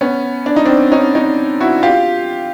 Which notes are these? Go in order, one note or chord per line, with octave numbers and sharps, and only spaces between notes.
B3 C#4
D4
D#4
C4 D4
C#4 D#4
C#4 D#4
E4 F#4
F4 G4